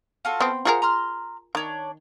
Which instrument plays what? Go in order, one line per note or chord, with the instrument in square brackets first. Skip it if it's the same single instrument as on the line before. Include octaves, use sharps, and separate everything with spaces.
[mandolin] F4 F#4 A4
[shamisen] B3 C4
[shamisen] F4 G#4 A#4 [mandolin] C5 F#5
[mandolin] A#5 C6 F6
[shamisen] D#3 [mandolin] D4 C#5